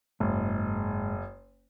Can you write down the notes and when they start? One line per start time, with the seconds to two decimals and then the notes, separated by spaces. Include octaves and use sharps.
0.20 F#1 G#2